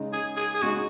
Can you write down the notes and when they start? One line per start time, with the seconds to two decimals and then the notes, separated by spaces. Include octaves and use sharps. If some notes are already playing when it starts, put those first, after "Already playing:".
Already playing: C#3 G#3 D#4
0.13 G#4
0.36 G#4
0.54 G#4
0.62 C#3 G#3 D#4 F#4